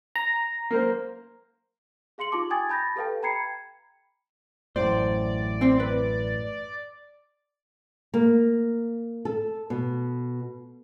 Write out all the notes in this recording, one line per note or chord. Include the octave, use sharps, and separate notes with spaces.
A#5
A#3 A#4 C5
G#4 F5 C6 C#7 F#7
D#4 F4 G4 A5 D6
G5 G#5 D#6 G#6 A6
A5 B5 G6 A6 A#6
G4 A4 B4 F5 G5 A5
G5 A#5 B5 G#6 C7 C#7
A1 F#2 A2 C5 D5
C4 C5 C6
B4
A#3
A4
B2